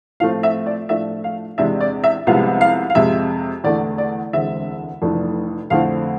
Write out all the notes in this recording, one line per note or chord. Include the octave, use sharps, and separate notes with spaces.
A2 F3 A3 C4 F5
E5
D5
A2 F3 A3 D4 E5
F5
E2 C3 G#3 D4 E5
D5
E5
C2 C3 F3 G#3 B3 F5
F5
F5
F2 C3 G#3 E5
E2 D3 A3 D4 D5
D5
E1 D2 D3 G#3 C4 E5
F1 F2 E3 A3 D4
F2 D3 A3 C4 E4 F5